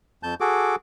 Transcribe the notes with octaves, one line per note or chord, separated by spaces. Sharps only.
F2 A5 G6
F#4 G#4 A4 D6